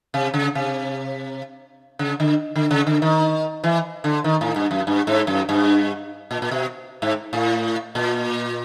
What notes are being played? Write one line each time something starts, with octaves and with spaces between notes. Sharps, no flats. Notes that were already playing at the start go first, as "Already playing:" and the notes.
C3
C#3
C3
C#3
D3
D3
C#3
D3
D#3
E3
D3
D#3
A2
G2
F#2
G2
G#2
F#2
G2
A#2
A#2
B2
G#2
A2
A#2